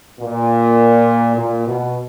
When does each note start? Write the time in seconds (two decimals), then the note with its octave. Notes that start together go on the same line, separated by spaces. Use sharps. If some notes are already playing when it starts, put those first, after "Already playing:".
0.20 A#2
1.36 A#2
1.65 B2